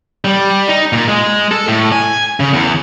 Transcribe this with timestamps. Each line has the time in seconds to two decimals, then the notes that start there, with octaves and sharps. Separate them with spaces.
0.25 G3
0.68 D#4
0.93 A#2
1.08 G#3
1.51 A4
1.68 A2
1.92 G#5
2.40 C#3
2.53 E2